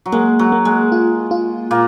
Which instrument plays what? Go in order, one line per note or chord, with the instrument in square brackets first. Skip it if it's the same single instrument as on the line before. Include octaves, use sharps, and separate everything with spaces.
[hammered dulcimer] F#3
[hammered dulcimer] G#3 [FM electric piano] A#3
[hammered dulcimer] F#3
[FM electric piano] A#3
[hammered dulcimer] G#3
[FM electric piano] F4
F4
[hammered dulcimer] A#2 A#3